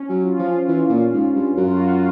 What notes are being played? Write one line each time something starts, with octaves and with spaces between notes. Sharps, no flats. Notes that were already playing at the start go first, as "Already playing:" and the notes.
Already playing: C#4
F#3
F4
F3
E3
A#2
G#2
G2
F#2 F#4
F4
F#4
F4